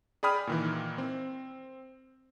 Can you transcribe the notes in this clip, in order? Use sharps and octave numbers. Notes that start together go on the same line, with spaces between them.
G#4 D5 G5 B5 D#6 F6
A#2 D#3 E3
C4